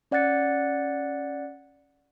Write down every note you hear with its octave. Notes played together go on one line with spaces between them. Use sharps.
C#4 D5 F#5 F#6 A6 C#7